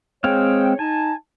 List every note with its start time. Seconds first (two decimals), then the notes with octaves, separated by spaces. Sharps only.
0.24 G#3 C4 G#4 C#5 F5 G5
0.79 D#4 G#5 A5